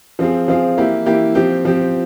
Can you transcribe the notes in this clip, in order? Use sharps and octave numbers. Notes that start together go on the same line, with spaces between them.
F3 C4 F4 G#4
F3 C4 F4 G#4
E3 A#3 E4 G4
E3 A#3 E4 G4
F3 C4 G4
F3 C4 G4